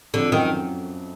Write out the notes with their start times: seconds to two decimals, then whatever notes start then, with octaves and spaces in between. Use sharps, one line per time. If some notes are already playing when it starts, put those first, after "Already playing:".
0.14 F2 D3 F3
0.26 F3
0.32 F#2 D#3 F#3